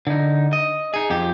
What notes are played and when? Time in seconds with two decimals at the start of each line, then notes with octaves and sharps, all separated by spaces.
0.07 D3 D#4
0.53 D#5
0.94 D#4 G#4
1.10 F2 G4